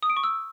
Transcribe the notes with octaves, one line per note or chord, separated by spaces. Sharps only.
D#6
D7
C#6
E6